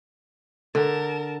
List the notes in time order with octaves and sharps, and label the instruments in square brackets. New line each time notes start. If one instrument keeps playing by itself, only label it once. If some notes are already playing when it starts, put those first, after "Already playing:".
[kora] D3 [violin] A#4 A5